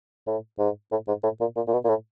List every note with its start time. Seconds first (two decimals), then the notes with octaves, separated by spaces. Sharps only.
0.27 A2
0.59 G#2
0.91 A2
1.08 G#2
1.23 A2
1.41 A#2
1.56 A#2
1.68 A#2
1.73 B2
1.85 A#2
1.89 A2